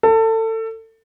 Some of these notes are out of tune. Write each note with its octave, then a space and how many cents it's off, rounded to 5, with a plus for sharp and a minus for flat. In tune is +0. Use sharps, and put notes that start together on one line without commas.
A4 +25